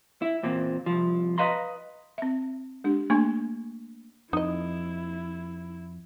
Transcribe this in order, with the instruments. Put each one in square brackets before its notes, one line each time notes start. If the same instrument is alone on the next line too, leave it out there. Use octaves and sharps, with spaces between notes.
[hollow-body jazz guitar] E4
E2 A#2 A#3 C4
C2 F3
B4 D#5 F5 A#5 C6
[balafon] C4 E5
G#3 D4 G4
A3 A#3 D4 G#5 C#6
[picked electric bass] F2 [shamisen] D#4 D#5 [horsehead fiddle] E4